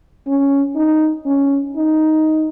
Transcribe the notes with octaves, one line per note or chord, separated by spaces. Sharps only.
C#4
D#4
C#4
D#4